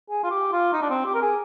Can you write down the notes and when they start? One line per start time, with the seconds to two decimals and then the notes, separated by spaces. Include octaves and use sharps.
0.10 G#4
0.24 F4
0.31 G4
0.53 F4
0.73 D#4
0.82 D4
0.90 C4
1.06 G4
1.15 A#4
1.22 G#4